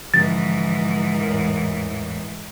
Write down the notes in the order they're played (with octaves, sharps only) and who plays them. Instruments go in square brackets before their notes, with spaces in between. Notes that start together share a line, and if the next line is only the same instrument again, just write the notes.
[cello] G#2 E3 [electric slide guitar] D3 F3 [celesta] A6
[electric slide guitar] E2 A2 A#4